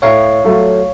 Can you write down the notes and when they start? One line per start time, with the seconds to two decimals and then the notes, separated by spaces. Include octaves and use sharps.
0.02 A2 C#5 F5
0.44 F#3 A3 F4